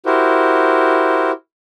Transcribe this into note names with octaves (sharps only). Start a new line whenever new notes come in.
E4 F#4 G4 A#4 C5